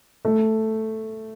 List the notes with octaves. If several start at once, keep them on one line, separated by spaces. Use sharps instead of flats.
A3